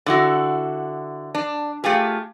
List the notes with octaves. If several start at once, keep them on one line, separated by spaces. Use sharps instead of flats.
D3 E4 F#4
D4
A3 F4 G4 G#4